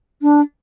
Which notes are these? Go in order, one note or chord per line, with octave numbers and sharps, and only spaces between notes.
D4